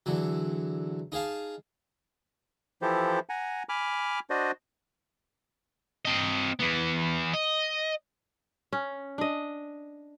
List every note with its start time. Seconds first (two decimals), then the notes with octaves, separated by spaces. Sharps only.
0.06 E2 D3 F#3
1.12 D#4 G#4 F5 A5
2.82 E3 F3 E4 G4 A4 C5
3.29 F#5 G#5 A#5
3.69 G#5 B5 D6 F6
4.30 D4 F#4 C5 D5 D#5
6.05 C4 D#5
6.59 E3 B3
7.33 D#5
8.72 C#4
9.18 D4 D#5